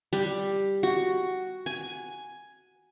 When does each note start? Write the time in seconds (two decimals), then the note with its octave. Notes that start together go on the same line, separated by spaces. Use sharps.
0.13 G3
0.83 F#4
1.66 G#5